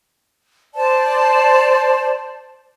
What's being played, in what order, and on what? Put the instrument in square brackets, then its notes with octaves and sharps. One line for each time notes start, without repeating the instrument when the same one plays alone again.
[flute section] C5 D5 A5